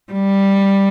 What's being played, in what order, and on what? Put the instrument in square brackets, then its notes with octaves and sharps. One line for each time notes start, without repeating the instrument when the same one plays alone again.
[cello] G3